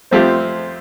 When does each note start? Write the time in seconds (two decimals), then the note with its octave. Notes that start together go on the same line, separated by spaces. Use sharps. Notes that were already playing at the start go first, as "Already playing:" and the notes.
0.11 F2 F3 A3 C4 G4 C5